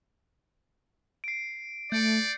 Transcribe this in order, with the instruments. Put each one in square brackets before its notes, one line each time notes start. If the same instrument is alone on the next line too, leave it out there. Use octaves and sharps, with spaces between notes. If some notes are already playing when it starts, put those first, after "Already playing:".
[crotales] C7 D7
[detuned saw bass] A3 [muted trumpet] D5 [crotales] G6 C#7